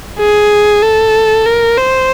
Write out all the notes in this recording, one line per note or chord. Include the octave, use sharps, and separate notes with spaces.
G#4
A4
A#4
C5